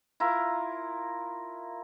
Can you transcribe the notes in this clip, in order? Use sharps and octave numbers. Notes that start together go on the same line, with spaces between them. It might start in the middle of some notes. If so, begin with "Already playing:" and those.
E4 F4 A#4